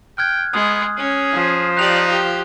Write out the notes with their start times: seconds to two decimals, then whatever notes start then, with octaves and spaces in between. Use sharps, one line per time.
0.18 G5 F6 F#6 G#6
0.54 G#3 B3 D#6
0.97 C#4 G#4
1.34 F3
1.77 D#4 G4 D5 F#6 F7
2.08 G4